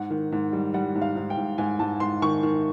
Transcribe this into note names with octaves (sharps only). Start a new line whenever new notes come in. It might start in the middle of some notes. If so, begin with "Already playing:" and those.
Already playing: G#2 F#5
D#3
G#2
G3
G3 F#5
G#2
F5
G#2
G5
G#2
G#2 G#5
G#2 A5
G#2 C6
D#3 C#6
D#3